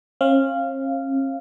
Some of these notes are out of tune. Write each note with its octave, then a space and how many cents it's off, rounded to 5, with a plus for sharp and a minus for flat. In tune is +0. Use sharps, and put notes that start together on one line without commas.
C#4 -45 F5 -10